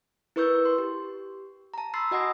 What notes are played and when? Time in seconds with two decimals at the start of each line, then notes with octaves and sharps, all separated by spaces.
0.36 E4 A#4 B4 C#6 E6 G6
0.65 C6
0.78 G4
1.74 A5 A#5
1.94 B5 C6 E6 A6 C7
2.11 F#4 D#5 F#5 G#5 D#6 A#6